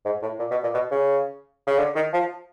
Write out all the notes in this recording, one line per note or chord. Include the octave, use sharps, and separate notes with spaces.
G#2
A2
A#2
B2
A#2
B2
C#3
C#3
D3
D#3
F3